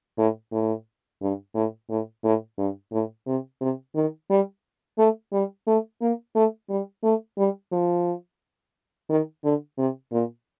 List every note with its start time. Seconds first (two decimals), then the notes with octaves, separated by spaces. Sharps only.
0.18 A2
0.52 A2
1.22 G2
1.55 A2
1.90 A2
2.24 A2
2.58 G2
2.92 A2
3.27 C3
3.61 C3
3.95 D#3
4.30 G3
4.98 A3
5.33 G3
5.67 A3
6.01 A#3
6.35 A3
6.70 G3
7.03 A3
7.38 G3
7.72 F3
9.09 D#3
9.44 D3
9.78 C3
10.12 A#2